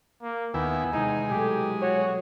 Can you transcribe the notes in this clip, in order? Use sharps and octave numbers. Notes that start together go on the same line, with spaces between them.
A#3
D#2 B3 E4 G5 G#5
E2 C3 G#3 C4 D#4
B2 F#3 A3 G4
F#4 C#5 D7